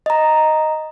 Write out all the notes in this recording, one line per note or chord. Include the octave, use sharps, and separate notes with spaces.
D#5 A#5